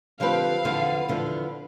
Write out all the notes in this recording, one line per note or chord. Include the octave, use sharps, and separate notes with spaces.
D3 F3 C4 G4 B4 F5
E2 D3 F3 B3
E2 D3 F3 B3